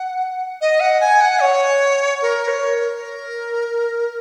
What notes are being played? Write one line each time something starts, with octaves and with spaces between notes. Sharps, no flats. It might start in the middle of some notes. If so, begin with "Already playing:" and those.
Already playing: F#5
D#5
F#5
G#5
F#5
C#5
A#4
C#5
A#4